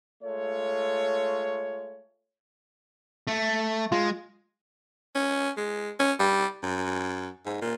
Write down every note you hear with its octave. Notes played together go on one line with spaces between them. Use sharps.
G#3 A3 F4 A4 C#5
A3
G#3 F4
C#4
G#3
C#4
G3
F#2
G#2
A#2